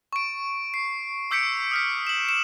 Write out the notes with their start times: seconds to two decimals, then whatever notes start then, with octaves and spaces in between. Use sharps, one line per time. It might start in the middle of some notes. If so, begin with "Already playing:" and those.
0.13 C#6 D7
0.74 C7
1.31 D6 E6 G6 B6 C#7 D7
1.71 D#6 F6 B6
2.07 E7 F#7
2.29 E7